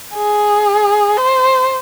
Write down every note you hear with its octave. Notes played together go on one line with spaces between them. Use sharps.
G#4
C5